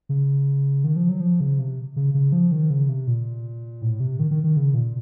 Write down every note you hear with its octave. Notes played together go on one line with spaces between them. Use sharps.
C#3
D#3
F3
F#3
F3
C#3
C3
C#3
C#3
F3
D#3
C#3
C3
A#2
A2
C3
D#3
D#3
D#3
C#3
A#2